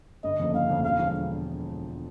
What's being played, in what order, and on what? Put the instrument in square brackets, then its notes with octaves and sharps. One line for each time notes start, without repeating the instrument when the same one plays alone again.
[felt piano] G1 [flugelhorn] D#5
[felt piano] F2 C#3 F3 A#3
[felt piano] G1 [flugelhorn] F5
[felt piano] F2 C#3 F3 A#3
[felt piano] E1 [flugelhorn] F5
[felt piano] D3 F3 G#3